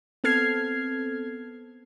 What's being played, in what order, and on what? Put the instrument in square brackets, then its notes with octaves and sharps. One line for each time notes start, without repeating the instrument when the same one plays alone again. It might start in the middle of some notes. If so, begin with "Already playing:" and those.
[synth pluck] B3 C4 A4 F6 G#6 C7